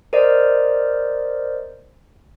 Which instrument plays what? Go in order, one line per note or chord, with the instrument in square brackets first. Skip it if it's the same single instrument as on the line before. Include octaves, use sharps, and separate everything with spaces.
[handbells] A#4 C5 D5 D#5